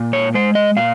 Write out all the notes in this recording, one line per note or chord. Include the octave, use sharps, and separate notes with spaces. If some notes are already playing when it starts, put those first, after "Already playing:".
Already playing: A#2
C#5
G#3 C5
D#5
A#2 F5